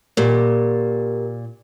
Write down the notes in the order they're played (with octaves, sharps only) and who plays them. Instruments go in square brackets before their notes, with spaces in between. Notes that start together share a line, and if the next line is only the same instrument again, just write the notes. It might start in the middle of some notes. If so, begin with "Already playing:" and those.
[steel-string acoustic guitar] A#2 [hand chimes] G4 A#4